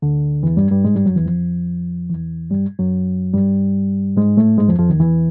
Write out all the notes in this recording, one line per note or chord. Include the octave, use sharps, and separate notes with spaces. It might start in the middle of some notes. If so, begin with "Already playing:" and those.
D2 D3
E2 E3
G2 G3
G2 G3
G#2 G#3
G2 G3
F#2 F#3
E2 E3
F2 F3
E2 E3
G2 G3
F#2 F#3
G2 G3
G#2 G#3
A2 A3
G#2 G#3
F2 F3
F2 F3
D#2 D#3
E2 E3